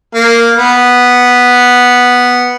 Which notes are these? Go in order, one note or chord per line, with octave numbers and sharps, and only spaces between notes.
A#3
B3